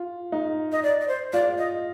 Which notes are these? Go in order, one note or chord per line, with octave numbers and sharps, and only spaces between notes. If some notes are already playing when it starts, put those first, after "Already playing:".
Already playing: F4
D#4
D#5
D5
D5
C5
F4 D5
D#5